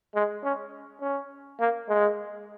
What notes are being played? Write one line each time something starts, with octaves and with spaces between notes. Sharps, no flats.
G#3
C#4
C#4
A#3
G#3